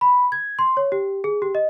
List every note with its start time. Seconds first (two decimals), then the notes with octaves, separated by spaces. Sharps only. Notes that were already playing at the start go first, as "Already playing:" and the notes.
0.01 B5
0.32 G#6
0.59 C6
0.77 C#5
0.92 G4
1.24 G#4
1.42 G4
1.55 D#5